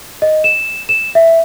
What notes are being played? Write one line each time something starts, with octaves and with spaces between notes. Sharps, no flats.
D#5
E7
E7
E5